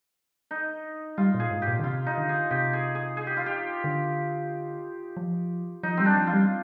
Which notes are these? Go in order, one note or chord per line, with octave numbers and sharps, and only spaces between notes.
D#4
G3 F4
A#2
G#4
G#2
G4
A#2
D3
C3 F4
D#4
D3
G#4
C3 G4
G#4
G#4
G#4
G4
F4
G4
D3
F3
F3 D#4
G3 C4
D4
F3
F4
G3